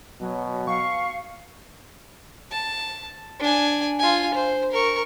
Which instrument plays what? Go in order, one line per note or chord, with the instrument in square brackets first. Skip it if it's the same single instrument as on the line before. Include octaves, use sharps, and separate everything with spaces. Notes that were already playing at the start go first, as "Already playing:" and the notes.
[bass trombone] B2 [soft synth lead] F#3
[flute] F5 [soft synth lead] C#6
[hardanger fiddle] A5
D4 G#5
F4 G#5
C5
A#4 C#6